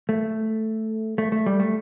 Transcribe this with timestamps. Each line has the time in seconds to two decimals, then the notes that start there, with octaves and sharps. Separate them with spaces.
0.09 A3
1.18 A3
1.32 A3
1.46 G3
1.60 A3